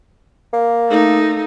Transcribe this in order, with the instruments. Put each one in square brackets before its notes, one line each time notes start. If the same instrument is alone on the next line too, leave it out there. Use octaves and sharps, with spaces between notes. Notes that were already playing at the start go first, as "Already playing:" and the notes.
[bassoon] A#3
[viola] A3 D#4